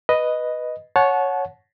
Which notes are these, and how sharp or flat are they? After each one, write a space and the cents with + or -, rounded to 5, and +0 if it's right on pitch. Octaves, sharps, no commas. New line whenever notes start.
B4 +0 D#5 +0
C#5 +0 F#5 -15 A5 -30